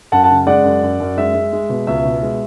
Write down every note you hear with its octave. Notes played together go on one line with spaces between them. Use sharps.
F#2 F#5 A5
F#5 A5
C#3
G#3 D5 F#5
F#2
F#2
F#2
G#3 E5
G#3
G#3
B2
C#2 E5
B2
G#3